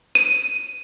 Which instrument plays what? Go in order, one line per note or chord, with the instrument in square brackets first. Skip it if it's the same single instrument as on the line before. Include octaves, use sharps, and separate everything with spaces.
[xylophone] D#7